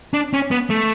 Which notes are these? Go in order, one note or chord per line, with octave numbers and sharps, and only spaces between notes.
D4
C#4
B3
A3